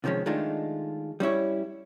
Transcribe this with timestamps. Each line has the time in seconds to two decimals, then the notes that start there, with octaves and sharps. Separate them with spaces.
0.04 C3 D#3 F3 G#3 C#4
0.26 D#3 G#3 A3 D4 D#4 F4
1.20 G3 C#4 E4 C#5